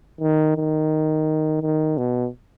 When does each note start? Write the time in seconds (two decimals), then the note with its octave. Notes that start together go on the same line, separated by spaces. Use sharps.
0.21 D#3
0.56 D#3
1.62 D#3
1.97 B2